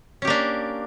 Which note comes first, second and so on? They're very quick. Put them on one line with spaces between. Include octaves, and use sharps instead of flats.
C#4 G4 A#3 D4